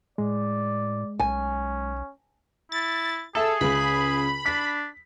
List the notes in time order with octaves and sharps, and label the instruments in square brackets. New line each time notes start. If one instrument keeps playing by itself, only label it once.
[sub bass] A2 [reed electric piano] G#3 [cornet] D5
[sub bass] B1 [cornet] C#4 [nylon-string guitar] G#5
[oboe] E4 [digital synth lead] A6
[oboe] G#4 [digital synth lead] A4 [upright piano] E5 A5
[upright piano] C#2 C#3 [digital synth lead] B5
[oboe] D4 [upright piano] B6